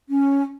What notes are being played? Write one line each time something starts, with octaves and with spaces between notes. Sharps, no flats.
C#4